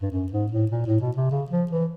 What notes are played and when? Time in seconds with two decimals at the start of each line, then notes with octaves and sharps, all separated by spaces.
0.02 G2
0.12 F#2
0.32 G#2
0.52 A2
0.71 A#2
0.86 A2
1.00 B2
1.16 C3
1.31 C#3
1.51 F3
1.71 E3